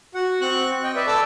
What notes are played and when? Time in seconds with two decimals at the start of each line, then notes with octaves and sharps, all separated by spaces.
0.15 F#4 F#5
0.41 C4 C#6 F#6
0.84 D#5 G5
0.95 B4 D5 E5
1.07 A4 B4 D5 A5 D6 E6